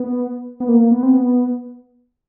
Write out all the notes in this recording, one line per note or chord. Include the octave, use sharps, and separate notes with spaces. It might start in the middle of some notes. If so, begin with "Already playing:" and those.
Already playing: B3
B3
A#3
B3
C4
B3